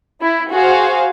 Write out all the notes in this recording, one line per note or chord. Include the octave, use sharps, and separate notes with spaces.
E4
F#4 G#4 C5 F5